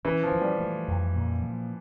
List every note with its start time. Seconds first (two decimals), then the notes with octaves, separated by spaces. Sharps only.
0.05 E3 C#4
0.23 F3
0.32 E3
0.41 G3
0.60 A3
0.88 F2
1.15 A#2
1.43 F3